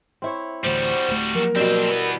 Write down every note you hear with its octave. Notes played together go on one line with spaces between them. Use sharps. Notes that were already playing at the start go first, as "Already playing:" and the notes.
C4 E4 C#5
A1 D2 G3 F#4 C5
D1 A3
F3 F#3 A#3 A#4
B2 G3 C4 D4
E3 B3